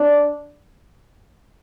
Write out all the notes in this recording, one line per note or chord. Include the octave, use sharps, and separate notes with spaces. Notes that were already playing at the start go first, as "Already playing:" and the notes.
Already playing: D4